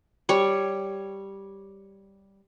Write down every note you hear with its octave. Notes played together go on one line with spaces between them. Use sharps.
G3 C#5